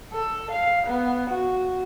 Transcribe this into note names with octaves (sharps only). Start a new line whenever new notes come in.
A4
F5
B3
F#4